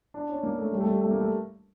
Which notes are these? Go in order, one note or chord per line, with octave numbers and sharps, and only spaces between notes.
D4
C#4
A#3
A3
G3
A3
G3
A3
A#3
A3